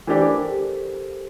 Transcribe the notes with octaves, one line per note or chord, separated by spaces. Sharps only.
E3 A3 D4 G4 C5
A#4
A4
G4